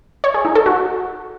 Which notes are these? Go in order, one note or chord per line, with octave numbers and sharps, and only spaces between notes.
C#5
G#4
D#4
A4
F#4